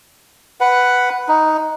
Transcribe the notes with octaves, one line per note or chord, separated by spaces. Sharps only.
B4 F#5
D#4